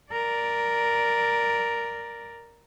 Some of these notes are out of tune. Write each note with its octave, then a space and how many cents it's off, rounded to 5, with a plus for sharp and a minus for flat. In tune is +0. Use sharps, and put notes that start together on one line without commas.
A#4 +0 D5 +0